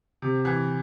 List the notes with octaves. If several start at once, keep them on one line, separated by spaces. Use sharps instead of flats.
C3
E3